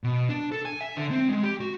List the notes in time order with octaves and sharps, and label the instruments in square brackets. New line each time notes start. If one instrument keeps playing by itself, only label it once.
[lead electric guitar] B2
D4
A4
G#5
E5
D3
C4
G#3
G4
F#4